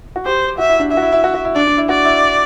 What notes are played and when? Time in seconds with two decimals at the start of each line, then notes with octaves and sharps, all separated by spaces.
0.16 F#4
0.25 G4 C5
0.58 F#4 E5
0.69 E4
0.80 D4
0.91 E4 E5
0.97 F#4
1.02 E4
1.12 E4
1.24 F#4
1.34 F#4
1.45 E4
1.56 D4 D5
1.67 D4
1.78 E4
1.89 F#4 D5
2.05 E4